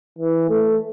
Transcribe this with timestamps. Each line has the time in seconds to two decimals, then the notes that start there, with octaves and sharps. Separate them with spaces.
0.18 E3
0.49 A3